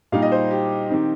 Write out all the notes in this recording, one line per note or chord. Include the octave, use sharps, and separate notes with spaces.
A#2 G3 D#4 F5
D#5
C5
G4
D#3 C4 D#4